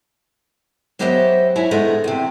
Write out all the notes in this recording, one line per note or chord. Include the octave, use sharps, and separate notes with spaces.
F#3 B3 G4 C5 D#5 E5
E4 C#5 E5 G#5
A2 D3 G#3 A3 B3 D#4
E2 C3